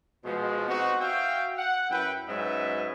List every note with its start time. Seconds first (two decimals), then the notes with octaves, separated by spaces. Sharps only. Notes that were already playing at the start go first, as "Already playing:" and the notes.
0.25 B2 F3 G#3
0.68 B3 C4 D#4 F#4
1.01 F#4 E5 F5 G5
1.58 F#5
1.90 F#2 E4 B4 G5
2.29 G#2 F#3 C#4 B4 D#5 E5